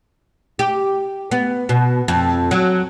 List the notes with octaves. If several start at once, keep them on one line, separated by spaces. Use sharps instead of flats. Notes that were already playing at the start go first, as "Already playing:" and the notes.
G4
B3
B2
F2
F#3